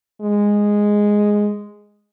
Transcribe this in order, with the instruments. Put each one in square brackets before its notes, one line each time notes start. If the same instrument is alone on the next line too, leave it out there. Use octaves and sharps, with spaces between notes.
[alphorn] G#3